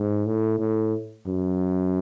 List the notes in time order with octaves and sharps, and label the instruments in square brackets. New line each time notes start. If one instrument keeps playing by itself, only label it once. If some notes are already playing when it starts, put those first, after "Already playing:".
Already playing: [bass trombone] G#2
A2
A2
F#2